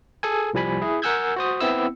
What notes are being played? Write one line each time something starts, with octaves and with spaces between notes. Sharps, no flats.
G#4 A4 G#5
C2 F3 G3 G#5 B5
E4 G#4
A#4 F#5 G#5 E6 G6 G#6
F#4 C5 D#6
B3 C4 E4 E6